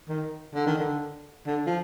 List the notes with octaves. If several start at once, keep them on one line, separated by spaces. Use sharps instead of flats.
D#3
D3
D#3
D3
D3
F3